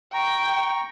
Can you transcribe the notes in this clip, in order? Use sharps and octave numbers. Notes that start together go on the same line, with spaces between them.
G5 A#5 C#6